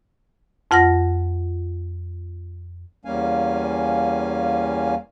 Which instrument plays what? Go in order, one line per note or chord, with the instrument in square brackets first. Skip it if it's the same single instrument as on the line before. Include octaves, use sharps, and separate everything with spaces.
[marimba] F2 F4 F#5 F6 A#6
[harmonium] E2 G3 A#3 C#4 F5 G#5